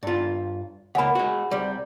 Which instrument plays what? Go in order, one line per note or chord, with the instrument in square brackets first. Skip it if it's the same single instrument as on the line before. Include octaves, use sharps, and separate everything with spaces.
[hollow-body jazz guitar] G2 F4
[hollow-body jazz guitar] C#2 A#3 [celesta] F#5 G#5 B5
[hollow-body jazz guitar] G#3 F#4
C2 G3